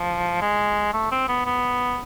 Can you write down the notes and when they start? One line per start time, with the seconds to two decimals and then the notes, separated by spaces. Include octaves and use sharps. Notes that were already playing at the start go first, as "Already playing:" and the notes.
Already playing: F3
0.42 G#3
0.93 A3
1.11 C4
1.28 B3
1.46 B3